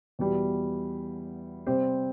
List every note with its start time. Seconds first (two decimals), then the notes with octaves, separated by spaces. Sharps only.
0.19 E2 B2 G3
1.66 C3 G3 C4 G4 C5